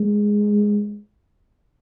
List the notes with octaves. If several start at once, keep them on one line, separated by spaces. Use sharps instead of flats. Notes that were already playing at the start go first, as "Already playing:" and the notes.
Already playing: G#3